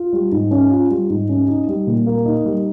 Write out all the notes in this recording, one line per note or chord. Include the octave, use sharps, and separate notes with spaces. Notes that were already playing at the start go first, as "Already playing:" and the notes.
Already playing: F4
G3
G#2
C#4
F4
G3
G#2
C#4
D#4
G3
A#2
A#3
D#4
G3